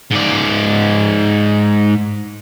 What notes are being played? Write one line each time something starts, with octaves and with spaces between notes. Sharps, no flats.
G#2 D5